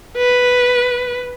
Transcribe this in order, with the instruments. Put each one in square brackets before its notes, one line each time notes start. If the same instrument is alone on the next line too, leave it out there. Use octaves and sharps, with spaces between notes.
[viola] B4